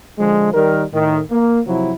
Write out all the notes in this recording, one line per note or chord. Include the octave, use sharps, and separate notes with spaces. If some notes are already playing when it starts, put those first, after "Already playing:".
D3 F3 G#3
D#3 G3 A#4
A2 D#3
A#3
C3 F3 F#3 E4